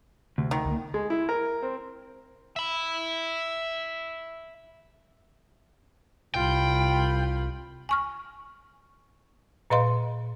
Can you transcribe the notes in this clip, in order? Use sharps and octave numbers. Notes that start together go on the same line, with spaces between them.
D2 C3
D#3
C#2 A#3
G#3
E4
A#4
C4
E5 B5
C2 F4 G5 B5
G#5 C#6 F6
A#2 B4 D#5 F5 C6